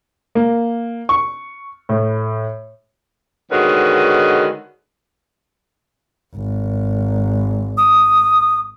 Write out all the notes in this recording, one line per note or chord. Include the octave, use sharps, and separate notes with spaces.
A#3
C#6
A2
D3 D#3 G#3 C#4 F#4 B4
G#1
D#6